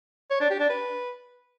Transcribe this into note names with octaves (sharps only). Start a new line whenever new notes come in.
C#5
D4
G4
D4
B4